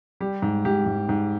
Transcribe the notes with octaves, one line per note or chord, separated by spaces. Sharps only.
G3 G4
G#2
G#2 G4
G#2
G#2